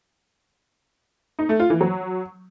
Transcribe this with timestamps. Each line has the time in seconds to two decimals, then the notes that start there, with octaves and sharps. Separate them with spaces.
1.39 D#4
1.49 A3
1.60 F4
1.70 E3
1.81 F#3